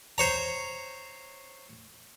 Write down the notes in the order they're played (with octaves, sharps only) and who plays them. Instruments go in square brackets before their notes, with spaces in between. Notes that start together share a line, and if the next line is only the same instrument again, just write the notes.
[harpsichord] C5 C#5 A#5